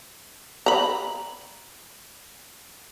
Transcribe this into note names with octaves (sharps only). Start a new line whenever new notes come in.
A#5 B5